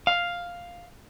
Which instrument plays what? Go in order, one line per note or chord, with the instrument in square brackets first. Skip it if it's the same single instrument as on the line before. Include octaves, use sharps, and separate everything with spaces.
[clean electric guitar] F5